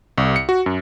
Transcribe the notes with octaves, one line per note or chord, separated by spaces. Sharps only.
C2
C#7
F#4
F#2